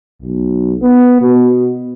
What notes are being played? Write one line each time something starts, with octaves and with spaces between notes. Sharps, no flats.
B1
B3
B2